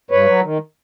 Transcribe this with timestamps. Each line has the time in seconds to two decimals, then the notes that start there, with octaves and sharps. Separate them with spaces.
0.11 G2 B4 C#5
0.27 F#3
0.43 D#3